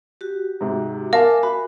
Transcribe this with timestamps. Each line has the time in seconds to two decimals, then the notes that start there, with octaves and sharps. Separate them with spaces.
0.21 F#4 G4
0.61 G#2 C3
1.13 A#4 E5 F5 G#5 A5 D6
1.43 F#4 B5